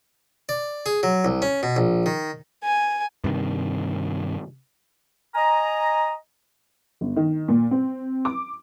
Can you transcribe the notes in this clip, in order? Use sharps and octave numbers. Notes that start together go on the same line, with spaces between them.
D5
G#4
F#3
C2
C#4
B2
A#1
D#3
G#5
G2 C3 D#3
D#5 G#5 A#5
G1
D#3
A#2
C4
D6